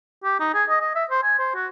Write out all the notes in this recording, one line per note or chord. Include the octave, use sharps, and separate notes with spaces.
G4
D#4
G#4
D#5
D#5
E5
C5
G#5
C5
F#4